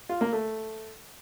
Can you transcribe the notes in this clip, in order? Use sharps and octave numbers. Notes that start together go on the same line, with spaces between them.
F4
A#3
A3